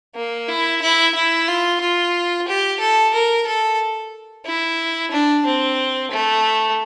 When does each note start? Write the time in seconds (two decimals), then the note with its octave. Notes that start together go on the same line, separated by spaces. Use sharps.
0.15 A#3
0.48 E4
0.82 E4
1.15 E4
1.48 F4
1.81 F4
2.48 G4
2.80 A4
3.14 A#4
3.47 A4
4.46 E4
5.12 D4
5.46 C4
6.12 A3